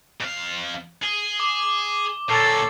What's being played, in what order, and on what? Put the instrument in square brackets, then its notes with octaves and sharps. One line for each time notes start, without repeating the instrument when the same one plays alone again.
[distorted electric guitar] F2 F5
[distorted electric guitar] G#4 [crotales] G7
[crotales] D6 G7
[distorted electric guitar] A#2 D3 [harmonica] A4 C#5 [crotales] A6 C7